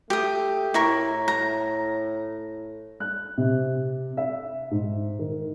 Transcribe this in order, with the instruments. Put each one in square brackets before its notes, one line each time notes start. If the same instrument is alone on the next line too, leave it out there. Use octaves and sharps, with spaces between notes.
[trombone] A3 [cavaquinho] G4 D#6
[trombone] A2 [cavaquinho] E4 A#4 C#6
[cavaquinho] A#5
[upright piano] F#6
C3
E5
G#2
D#3